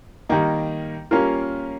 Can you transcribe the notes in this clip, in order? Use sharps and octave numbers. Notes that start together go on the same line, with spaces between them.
D#3 G3 A#3 D#4
G3 A#3 C#4 F4 A#4